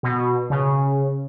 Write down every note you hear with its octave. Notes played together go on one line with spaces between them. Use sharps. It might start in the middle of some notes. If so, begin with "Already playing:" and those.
B2
C#3